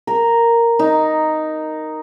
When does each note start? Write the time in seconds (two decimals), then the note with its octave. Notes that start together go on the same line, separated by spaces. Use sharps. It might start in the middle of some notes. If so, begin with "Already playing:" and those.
0.07 A#4
0.79 D#4